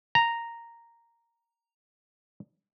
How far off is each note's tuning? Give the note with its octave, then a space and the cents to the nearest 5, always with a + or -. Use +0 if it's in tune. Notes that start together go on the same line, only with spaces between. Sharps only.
A#5 -5